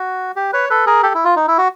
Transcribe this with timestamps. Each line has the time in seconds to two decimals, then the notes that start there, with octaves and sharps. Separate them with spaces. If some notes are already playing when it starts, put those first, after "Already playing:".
Already playing: F#4
0.36 G4
0.53 B4 C#5
0.69 A4 B4
0.86 G#4 A#4
1.03 G4 A4
1.15 E4
1.25 F4
1.36 D#4
1.48 E4
1.58 F#4